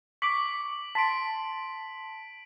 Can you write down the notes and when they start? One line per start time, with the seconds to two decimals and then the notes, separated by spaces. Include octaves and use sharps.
0.22 C#6 D6 B6 F#7
0.95 A5 C6 B6 D7